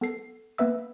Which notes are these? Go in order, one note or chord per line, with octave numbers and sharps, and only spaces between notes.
B3 A4 C7
A#3 B3 B4 E5 E6